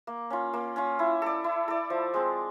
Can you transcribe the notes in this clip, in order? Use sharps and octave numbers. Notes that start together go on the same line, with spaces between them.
A#3
C#4 F4
A#3
C#4 F4
E4
A4 D5
E4
A4 D5
F3
G#3 C4